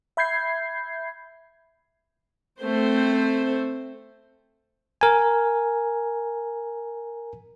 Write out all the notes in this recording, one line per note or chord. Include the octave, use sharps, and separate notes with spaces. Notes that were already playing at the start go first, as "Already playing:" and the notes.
E5 B5 G6 G#6 C7
A3 C4 C5
A#4 G#5